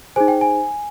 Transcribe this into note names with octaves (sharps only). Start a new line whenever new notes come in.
D#4 G#4 C5 G#5
G5
G#5